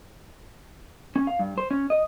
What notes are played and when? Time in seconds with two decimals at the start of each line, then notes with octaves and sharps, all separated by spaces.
1.16 C#4
1.27 F5
1.39 G2
1.58 C5
1.71 C#4
1.90 D#5